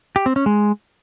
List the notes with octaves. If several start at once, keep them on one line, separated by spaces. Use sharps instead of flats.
G4
C4
C#4
G#3